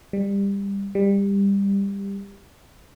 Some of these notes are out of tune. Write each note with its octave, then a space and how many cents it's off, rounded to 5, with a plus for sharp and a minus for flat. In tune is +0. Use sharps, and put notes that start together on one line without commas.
G3 +20
G3 +20